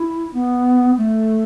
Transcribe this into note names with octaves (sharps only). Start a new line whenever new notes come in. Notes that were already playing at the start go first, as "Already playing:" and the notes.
Already playing: E4
B3
A3